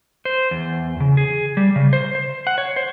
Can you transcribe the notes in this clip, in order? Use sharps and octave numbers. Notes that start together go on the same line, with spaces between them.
C5
E2
C#3
G#4
G3
C#3
C5
C5
F#5
C#5
C5